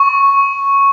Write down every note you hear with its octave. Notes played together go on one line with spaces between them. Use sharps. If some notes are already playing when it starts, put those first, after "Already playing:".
Already playing: C#6